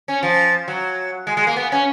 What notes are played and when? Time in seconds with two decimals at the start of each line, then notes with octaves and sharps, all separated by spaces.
0.08 C#4
0.23 F3
0.68 F#3
1.27 G#3
1.37 G#3
1.47 A#3
1.56 B3
1.72 C#4